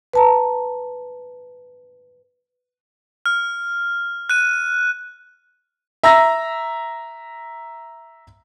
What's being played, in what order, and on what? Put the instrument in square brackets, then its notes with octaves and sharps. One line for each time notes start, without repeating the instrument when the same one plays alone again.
[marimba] B4 A5 A#5
[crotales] F6
F#6 D#7
[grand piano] E5 A#5 E6 A#6